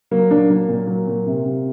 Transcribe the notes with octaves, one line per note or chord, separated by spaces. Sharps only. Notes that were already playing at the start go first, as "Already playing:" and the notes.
F#3 A#3
A#2 A#3 D4
F#3 A#3
A#2
F#3
A#2
C3
C3